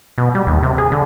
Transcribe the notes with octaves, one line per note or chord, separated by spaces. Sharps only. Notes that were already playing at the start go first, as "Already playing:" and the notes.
B2
G3
D#2
C3
G#4
D3